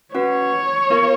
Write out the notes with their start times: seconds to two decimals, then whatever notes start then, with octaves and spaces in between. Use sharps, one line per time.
0.14 C#4 F#4 B4 C#5 F#5
0.90 B3 F4 A#4 F5